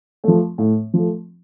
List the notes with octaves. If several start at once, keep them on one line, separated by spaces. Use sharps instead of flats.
F3 A3
A2
F3 A3